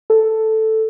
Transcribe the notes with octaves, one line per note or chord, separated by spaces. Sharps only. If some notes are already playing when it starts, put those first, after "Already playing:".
A4